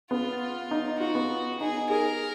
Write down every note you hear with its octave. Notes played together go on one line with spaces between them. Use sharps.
B3 F4
F4
D#4
F4 F#4
B3
D#4 G#4
G#4 A#4